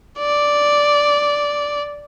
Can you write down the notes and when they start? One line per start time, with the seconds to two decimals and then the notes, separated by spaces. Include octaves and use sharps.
0.19 D5